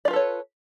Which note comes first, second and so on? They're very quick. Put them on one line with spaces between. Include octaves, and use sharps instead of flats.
D5 F4 B4 A4 C#5